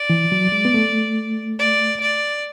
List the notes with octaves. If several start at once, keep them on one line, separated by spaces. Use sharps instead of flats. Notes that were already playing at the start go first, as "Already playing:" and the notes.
Already playing: D5
E3
F#3
G#3
B3
A3
D5
D5